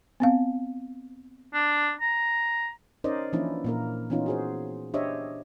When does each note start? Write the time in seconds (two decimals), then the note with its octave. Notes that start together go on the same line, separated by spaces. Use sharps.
0.20 B3 C4 F5
1.54 D4
2.01 A#5
3.04 C#4 D#4 A#4 C5 D5 D#5
3.33 E3 F3 A#3 C#4 D4 E4
3.64 A#2 A#3 A#4
4.10 E3 B3 C#4 D#4 F4
4.26 F#4 G#4 C5
4.94 D4 G4 C5 C#5 D#5 E5